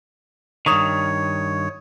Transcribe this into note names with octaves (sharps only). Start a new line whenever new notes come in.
G2 D#3 C#5 C#6 D#6 F7